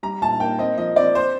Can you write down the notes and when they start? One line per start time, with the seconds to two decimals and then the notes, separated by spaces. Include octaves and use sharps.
0.03 G3 A#5
0.22 A#2 A5
0.40 A#3 G5
0.59 C4 D#5
0.78 F3 D#5
0.96 C4 D5
1.15 C5